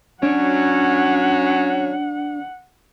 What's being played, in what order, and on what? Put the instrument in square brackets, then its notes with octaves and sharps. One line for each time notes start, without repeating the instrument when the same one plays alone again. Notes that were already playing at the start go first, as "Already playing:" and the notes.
[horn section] F#3 C#4 [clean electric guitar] D4 [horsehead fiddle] F#5